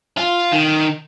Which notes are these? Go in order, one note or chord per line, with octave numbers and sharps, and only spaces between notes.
F4
D#3